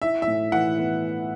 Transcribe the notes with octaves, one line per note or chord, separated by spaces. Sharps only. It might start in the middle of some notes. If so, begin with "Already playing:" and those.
E4 E5
E5
A2
E3 F#5
B3